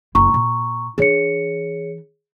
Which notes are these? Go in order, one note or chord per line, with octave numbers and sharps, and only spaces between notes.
F#1 E4 A#5 C#6
A#2
E3 D4 G#4 C#5 C#7